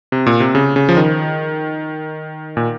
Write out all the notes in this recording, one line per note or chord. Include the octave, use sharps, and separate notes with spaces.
C3
A#2
C3
C#3
C#3
F3
D#3
A#2